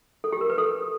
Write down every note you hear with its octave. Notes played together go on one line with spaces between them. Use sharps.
A4
G4
A#4
B4
A4